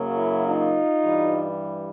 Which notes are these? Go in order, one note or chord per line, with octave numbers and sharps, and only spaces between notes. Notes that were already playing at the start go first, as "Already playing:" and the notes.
Already playing: F#2 C#3 F#3 A#3
E4
D#4 F4
G2 E3 G3